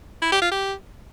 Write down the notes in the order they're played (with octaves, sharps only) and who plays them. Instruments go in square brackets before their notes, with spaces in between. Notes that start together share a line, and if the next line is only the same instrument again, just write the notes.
[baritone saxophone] E4
G4
F4
G4